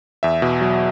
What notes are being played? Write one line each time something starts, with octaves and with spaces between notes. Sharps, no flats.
E2 E5
B2
F#3